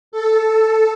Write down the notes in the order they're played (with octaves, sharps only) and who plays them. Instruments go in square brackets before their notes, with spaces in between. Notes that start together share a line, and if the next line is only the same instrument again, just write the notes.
[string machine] A4